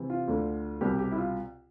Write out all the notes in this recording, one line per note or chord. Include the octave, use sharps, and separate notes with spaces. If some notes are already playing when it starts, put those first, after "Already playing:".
Already playing: C3 E3
F4
D2 D3
C2 B2 G4
G4
E4
F4